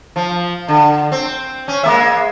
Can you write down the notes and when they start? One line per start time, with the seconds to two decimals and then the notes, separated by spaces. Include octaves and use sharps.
0.16 F3
0.68 D3
1.12 C4
1.68 C#4
1.83 G#3 A#3 E5